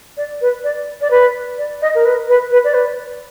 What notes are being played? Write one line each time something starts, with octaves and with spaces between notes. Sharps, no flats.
D5
B4
D5
D5
B4
D5
D#5
A#4
B4
B4
B4
D5
B4